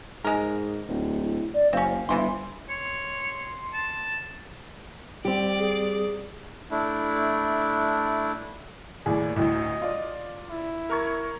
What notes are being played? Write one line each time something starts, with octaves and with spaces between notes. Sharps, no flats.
G#2 G#3 A#4
D1
E4
D5
F#1 C4 C#4 F5
G1 C3 E3 C6
C#5 C6
A5
G3 C4 G4 D5
G#4
A3 D4 E4
D#2 A2 G#4 D5
D2 A2 D#5
F4 D5
E4
A#4 C#6 G#6